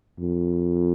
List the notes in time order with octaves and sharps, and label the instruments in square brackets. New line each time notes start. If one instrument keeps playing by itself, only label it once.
[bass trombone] F2